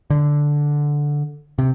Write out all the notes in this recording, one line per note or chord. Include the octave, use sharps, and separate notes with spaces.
D3
C3